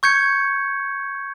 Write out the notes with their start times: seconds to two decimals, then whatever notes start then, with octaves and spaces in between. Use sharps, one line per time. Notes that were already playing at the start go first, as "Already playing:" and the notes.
0.03 C#6 G6 G#6 C#7